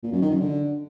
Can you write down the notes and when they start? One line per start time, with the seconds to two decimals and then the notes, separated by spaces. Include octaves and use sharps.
0.03 A#2
0.12 F#2
0.22 D#3
0.31 F#2
0.40 D3